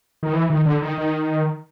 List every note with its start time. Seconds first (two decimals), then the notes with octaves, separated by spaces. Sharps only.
0.23 D#3
0.33 E3
0.50 D#3
0.66 D3
0.82 D#3
0.98 D#3